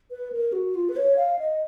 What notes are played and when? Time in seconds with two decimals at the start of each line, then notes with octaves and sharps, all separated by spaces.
0.11 B4
0.32 A#4
0.53 F#4
0.75 F4
0.89 B4
0.96 C#5
1.17 F5
1.39 D#5